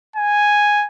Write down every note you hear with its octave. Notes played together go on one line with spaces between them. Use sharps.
G#5